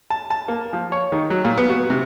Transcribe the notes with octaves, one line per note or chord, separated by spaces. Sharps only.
A5
A5
A#3
F3
C#5
D#3
F#3
A#2
B3
F#4
C3